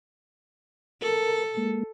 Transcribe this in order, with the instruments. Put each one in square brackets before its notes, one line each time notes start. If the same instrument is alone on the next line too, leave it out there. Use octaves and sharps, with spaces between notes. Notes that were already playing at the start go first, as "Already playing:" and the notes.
[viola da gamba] A4 [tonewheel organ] A#4
[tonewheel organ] G#3 A#3